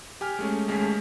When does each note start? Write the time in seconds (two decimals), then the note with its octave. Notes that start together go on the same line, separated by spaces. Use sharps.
0.21 G4 G#5 F6
0.39 G#3 A3 C#4
0.68 D#2 G#3 A3 C#4 G#5 B6